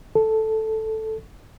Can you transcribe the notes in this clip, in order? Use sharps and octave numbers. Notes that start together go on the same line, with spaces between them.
A4